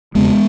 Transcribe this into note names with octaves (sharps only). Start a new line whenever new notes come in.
E1 E2 C#3 G#3 B3